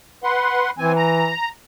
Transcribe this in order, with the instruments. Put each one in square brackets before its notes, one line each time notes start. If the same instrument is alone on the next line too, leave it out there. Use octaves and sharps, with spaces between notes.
[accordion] B4 F#5 C6
[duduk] E3 [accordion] C4 G#5
[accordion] A#5